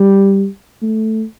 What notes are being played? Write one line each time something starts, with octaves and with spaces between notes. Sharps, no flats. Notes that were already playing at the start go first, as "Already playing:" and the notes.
Already playing: G3
A3